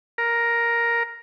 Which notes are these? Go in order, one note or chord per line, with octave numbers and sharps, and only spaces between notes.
A#4